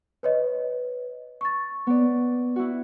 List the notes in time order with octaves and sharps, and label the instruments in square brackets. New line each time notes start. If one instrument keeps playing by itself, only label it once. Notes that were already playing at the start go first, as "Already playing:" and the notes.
[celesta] B4 C#5 D#5
C#6 A6
[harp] B3 D5
E4 F#4